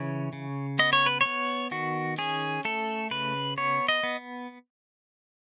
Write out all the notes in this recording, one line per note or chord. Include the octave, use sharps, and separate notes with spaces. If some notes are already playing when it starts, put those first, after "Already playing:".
Already playing: C#3 E3 C#5
C#3
B3 D#5
C#5
B4
B3 C#5
D#3 F#4
C#4 G#4
A3 A4
C#3 B4
B3 C#5
D#5
B3